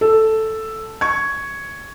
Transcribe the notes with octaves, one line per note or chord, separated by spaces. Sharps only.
A4
C#6 G#6